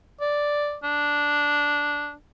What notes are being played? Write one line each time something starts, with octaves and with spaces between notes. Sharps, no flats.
D5
D4